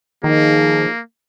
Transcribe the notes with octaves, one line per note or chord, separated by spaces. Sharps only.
D#3 F3 A#3 D#4 G#4